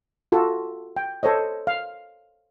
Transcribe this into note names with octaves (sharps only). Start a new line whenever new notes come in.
F4 F#4 A4
G5
A4 C5 C#5 D#5
F5